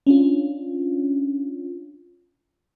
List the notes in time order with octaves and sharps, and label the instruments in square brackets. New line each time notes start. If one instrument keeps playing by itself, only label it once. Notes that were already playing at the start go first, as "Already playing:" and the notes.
[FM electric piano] C#4 D4 F4